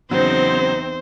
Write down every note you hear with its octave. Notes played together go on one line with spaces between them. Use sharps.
E2 C#3 F#3 C4 D#4 C5